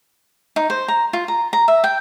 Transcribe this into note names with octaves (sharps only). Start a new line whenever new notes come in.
D#4
C5
A#5
F4
A#5
A#5
E5
G5